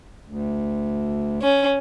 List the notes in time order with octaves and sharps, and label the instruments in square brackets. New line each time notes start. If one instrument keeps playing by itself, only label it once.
[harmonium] D2
[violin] C#4